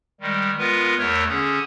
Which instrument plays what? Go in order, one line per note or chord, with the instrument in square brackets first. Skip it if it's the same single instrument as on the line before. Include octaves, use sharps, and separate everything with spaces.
[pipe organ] D#3 G3 G#3
G#3 B3 F4 A#4 B4
E2 A3 A#4 C#5
D3 C#4 G#4